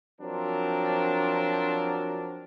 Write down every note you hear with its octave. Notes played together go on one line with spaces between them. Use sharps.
F3 F#3 C4 D4 A#4